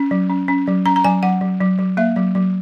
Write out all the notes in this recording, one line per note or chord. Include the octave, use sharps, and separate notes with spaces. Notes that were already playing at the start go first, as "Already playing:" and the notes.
Already playing: C#4
F#3
C#4
C#4
F#3
C#4 A#5
A#5
F#3 G#5
F#3 F#5
F#3
F#3
F#3
A#3 E5
F#3
F#3